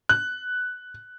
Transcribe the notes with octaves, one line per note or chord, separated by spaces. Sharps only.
F#6